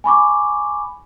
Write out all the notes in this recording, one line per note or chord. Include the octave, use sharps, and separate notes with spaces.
G#5 B5 C#6 D6